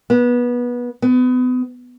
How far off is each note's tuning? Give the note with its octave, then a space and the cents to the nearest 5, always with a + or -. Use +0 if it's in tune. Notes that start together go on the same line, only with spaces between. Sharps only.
B3 -20
B3 +35